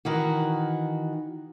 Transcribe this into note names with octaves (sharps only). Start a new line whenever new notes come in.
D#3 E3 F#4